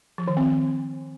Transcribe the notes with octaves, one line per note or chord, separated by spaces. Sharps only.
F3
D#3
C4